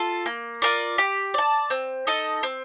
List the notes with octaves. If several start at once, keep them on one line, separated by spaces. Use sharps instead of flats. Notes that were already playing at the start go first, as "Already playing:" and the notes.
Already playing: F4 A4
A#3
F4 A#4 D5
G4
D5 A5
C4
D#4 A4 D#5
C4